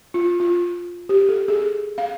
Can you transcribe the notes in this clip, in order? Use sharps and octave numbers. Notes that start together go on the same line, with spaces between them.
F4
F4
G4
A4
G#4
F5